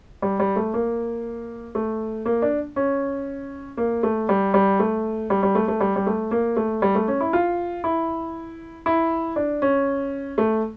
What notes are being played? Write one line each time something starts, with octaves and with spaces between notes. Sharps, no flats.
G3
G3
A3
A#3
A3
A#3
D4
C#4
A#3
A3
G3
G3
A3
G3
G3
A3
A3
G3
G3
A3
A#3
A3
G3
A3
C#4
E4
F4
E4
E4
D4
C#4
A3